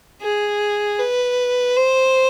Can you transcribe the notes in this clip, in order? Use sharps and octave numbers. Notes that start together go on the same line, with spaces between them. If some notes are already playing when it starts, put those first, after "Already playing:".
G#4
B4
C5